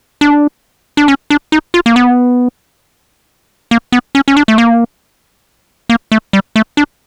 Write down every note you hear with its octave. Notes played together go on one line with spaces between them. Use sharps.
D4
D4
C#4
D4
D#4
F4
A#3
B3
A#3
B3
C#4
C#4
D4
A3
A#3
A#3
A3
G3
A3
D4